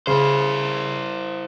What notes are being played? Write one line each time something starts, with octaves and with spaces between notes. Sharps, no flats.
C#3 E4 C5